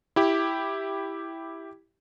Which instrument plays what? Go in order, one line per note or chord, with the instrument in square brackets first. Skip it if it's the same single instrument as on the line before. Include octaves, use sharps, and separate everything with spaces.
[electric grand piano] E4 G4